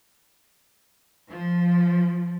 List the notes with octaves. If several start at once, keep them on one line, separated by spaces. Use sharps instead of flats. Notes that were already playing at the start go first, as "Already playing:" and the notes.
F3